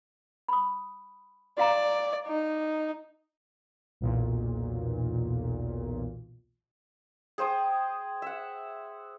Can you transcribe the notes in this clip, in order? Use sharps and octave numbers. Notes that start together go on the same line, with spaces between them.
B5 D#6
F#4 D5 F5 A#5
D#4
B1 E2 A#2
G#4 C5 G5 D#6
E5 F#5